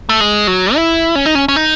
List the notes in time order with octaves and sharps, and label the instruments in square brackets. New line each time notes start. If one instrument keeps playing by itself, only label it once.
[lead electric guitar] A3
G#3
F#3
E4
C#4
D#4
C#4
C#4
D#4